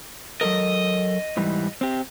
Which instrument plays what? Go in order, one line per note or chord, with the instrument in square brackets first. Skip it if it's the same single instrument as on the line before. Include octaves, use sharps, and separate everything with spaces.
[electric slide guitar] F#3 A4 A#4 [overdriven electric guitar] D#5
[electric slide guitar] G#2 E3 G3
C4 G4